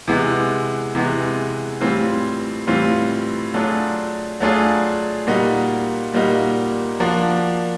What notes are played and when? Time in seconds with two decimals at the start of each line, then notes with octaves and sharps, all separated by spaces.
0.08 C3 E3 G#3 B3
0.95 C3 E3 G#3 B3
1.81 A2 E3 G3 C4 F4
2.67 A2 E3 G3 C4 F4
3.54 F#3 A3 D4 F4 G#4
4.40 F#3 A3 D4 F4 G#4
5.27 A#2 G3 A#3 D#4 F#4
6.14 A#2 G3 A#3 D#4 F#4
7.00 F3 A#3 D4 F#4